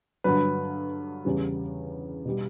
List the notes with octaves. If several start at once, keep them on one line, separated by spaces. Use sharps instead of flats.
G2 D3 F#3 B4
E2 C#3 G3
B2 G3